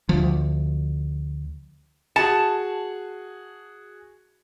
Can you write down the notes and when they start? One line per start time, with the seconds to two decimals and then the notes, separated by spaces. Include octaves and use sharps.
0.09 D2 F3
2.16 F#4 G#4 A5 C#7